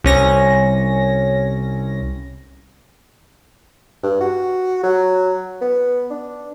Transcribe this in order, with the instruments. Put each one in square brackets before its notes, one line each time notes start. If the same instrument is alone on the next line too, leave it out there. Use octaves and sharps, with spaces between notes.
[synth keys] C2 C#4 A#6
[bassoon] G2
F#4
F#3
B3
D4